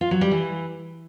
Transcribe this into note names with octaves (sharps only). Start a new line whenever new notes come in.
F4
F#3
G3
E3